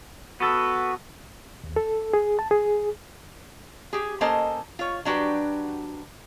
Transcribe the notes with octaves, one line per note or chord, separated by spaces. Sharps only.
B3 F#4 A4
D#2
A4
G#4
A5
G#4
G4 G#4
A#3 C#4 A4 C5 D#5 A5
F4 C#5
F#3 D4 F#4 G4 B4